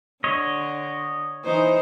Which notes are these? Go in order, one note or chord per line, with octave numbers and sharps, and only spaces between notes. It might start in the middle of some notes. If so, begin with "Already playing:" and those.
D3 C#5 D#5
E3 D#4 C5